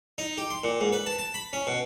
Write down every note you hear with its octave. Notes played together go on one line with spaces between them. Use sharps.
D#4
G4
C6
A#2
G#2
B4
A5
A5
B5
C#4
B2